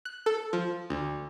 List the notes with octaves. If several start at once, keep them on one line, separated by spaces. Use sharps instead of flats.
F#6
A4
F3
D2